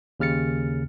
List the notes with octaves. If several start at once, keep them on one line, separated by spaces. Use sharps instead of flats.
D#2 C#3 F6 A6 C#7